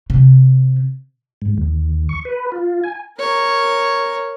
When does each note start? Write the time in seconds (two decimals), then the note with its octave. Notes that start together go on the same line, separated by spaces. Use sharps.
0.10 C3
1.42 G#2
1.58 D#2
2.09 C#6
2.25 B4
2.52 F4
2.84 G#5
3.19 A#4 C#5